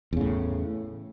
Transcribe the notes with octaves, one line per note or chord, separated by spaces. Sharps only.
E2 A2 C#3